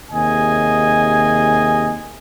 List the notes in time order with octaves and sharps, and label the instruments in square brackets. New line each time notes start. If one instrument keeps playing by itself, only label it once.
[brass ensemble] D#2 C3 G#4 D#5 G#5